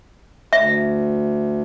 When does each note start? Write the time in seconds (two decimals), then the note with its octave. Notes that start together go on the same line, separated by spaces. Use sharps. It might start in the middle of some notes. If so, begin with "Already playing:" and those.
0.53 D2 E5